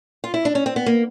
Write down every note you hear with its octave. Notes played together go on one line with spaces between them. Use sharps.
F4
E4
D4
C#4
C4
B3
A#3